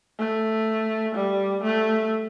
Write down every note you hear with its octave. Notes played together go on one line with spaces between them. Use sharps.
A3
G3
A3